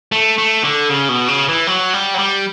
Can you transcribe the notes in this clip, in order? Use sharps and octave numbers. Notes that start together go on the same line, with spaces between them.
A3
A3
D3
C#3
B2
C#3
E3
F#3
G3
F#3
G3